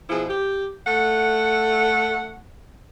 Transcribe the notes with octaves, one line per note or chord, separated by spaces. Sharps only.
B2 F3 E4 G#4
G4
A3 F#5